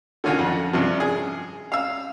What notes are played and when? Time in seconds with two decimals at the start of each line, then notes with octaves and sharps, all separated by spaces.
0.24 D3 D#3 C#4 F4 F#4 G#5
0.39 F2 F#5
0.73 G2 C3 F3
1.00 G#4
1.72 F5 E6